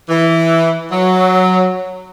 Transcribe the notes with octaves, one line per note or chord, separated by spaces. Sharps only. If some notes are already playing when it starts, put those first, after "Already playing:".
E3
F#3